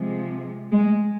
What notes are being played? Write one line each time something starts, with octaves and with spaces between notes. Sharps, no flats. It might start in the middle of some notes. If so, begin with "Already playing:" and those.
Already playing: C3 F3 G#3
G#3